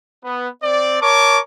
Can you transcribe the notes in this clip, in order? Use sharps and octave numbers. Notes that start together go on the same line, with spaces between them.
B3
C4 D5
A#4 C#5 A5 C#6 D6